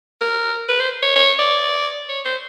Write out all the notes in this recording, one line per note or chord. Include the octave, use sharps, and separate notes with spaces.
A#4
B4
C5
C#5
C#5
D5
C#5
C5